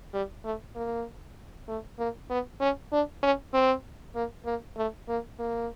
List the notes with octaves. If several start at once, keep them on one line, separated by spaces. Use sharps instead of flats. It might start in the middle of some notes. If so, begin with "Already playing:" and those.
G3
A3
A#3
A3
A#3
B3
C#4
D4
C#4
C4
A#3
A#3
A3
A#3
A#3